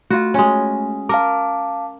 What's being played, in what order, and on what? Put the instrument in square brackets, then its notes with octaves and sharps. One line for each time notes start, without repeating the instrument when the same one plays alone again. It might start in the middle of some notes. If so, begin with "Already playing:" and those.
[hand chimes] A3 [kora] F4 F#4
[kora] G#3 C#4
[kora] A#4 [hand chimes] F5 A5 D6